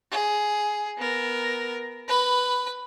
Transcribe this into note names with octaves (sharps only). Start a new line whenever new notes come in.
G#4
B3 A#4
B4 B5